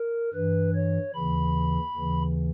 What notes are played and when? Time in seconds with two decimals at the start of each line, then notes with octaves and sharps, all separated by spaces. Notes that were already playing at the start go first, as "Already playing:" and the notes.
Already playing: A#4
0.34 G2 E3 B4
0.75 C#5
1.14 D#2 C#3 E3 B5
1.94 D#2 C#3 E3